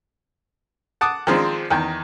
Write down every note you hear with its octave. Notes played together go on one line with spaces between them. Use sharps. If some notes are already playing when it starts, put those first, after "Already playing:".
F#5 A5 D6 D#6
D#3 F3 G#3 C4 D4
E2 D#3 G5